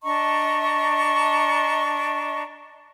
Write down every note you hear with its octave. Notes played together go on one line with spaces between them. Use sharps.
D4 D#5 A#5 C#6